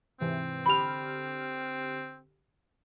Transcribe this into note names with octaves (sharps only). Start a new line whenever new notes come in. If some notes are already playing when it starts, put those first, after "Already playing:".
G#2 C3 E3 C4
D3 G4 B5 F6 F7